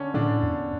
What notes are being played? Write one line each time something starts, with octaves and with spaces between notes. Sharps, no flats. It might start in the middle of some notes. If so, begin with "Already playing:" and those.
Already playing: D3 C#4 D4
A2 D3 D4
E2